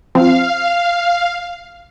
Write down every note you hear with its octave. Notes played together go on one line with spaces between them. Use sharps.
F3 C4 F5